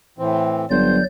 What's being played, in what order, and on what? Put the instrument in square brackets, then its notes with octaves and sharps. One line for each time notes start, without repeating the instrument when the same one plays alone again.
[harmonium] A2 E3 C4
[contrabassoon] G1 [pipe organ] F#3 D5 G6 [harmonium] C5